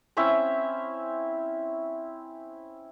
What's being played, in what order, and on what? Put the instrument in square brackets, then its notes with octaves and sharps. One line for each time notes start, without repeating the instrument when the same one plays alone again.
[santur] C4 C#4 E4 E5